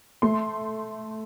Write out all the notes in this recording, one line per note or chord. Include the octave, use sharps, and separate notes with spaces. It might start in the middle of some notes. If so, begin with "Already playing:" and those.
A3 C6